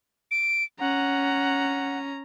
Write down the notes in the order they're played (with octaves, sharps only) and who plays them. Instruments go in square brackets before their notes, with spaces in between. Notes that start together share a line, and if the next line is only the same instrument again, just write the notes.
[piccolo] D7
[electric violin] C#4 A#5 [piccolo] F#5